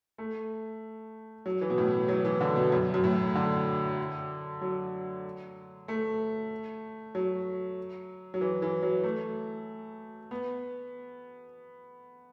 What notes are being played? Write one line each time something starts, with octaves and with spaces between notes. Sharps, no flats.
A3
F#3
E3
B2
A2
F#3
E3
D3
B2
F#2
F#2
A2
D3
F#3
A3
F#3
F#3
E3
E3
F#3
A3
B3